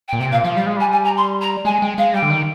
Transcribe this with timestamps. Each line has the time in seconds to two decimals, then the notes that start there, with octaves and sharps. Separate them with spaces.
0.08 G5
0.13 A#2
0.20 C3 G5
0.31 A#2 F5
0.44 F3 F5
0.56 G3 F5
0.66 G#3
0.77 G3 G#5
0.92 G#5
1.04 A#5
1.17 C6
1.41 A#5
1.65 G#3 G#5
1.81 G#3 G5
1.98 G#3 F5
2.14 G3 G5
2.22 D3
2.30 D#3